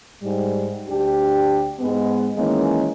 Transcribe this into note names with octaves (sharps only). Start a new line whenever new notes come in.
G#2 G3
D2 D4 G4
G#2 G#3 B3
D#3 E3 G#3 A#3 C#4